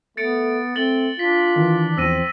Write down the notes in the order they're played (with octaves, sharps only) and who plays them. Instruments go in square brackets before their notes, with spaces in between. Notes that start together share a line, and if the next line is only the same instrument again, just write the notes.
[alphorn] A3 [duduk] B3 [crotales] A6 C#7 D7
[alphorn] A3 [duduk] C4 [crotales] A6 F#7 G7
[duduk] D4 [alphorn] F4 [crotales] B6
[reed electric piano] D#3 E3
[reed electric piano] E2 F3 [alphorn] C4 [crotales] E6 A#6 D#7